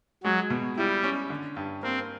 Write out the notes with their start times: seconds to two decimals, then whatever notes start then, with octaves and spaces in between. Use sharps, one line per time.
0.24 F#3 G#3
0.50 B2
0.77 G3 E4
1.04 C#4
1.30 D3
1.57 G2
1.83 A#3 C4